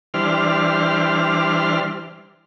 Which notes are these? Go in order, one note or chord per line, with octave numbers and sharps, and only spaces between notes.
E3 G3 D4 C5 F6